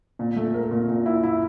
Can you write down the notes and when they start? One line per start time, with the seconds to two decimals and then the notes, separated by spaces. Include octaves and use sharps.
0.19 A#2
0.36 A3
0.54 A#4
0.71 A#2
0.89 A#2
1.06 E4
1.23 E4